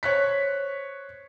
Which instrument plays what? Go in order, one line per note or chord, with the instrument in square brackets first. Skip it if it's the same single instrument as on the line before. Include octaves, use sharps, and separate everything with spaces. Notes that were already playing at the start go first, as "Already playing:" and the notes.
[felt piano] C5 C#5 F#6 B6